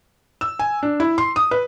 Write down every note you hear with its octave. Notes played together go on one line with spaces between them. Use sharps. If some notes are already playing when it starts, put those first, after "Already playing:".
E6
G#5
D4
E4
C6
D#6
B4